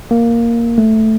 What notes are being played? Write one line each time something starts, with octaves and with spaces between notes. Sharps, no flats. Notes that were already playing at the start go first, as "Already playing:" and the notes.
A#3
A3